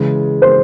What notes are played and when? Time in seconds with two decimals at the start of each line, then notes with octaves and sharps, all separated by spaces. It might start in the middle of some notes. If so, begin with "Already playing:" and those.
Already playing: C#3 E3 G#3
0.42 C5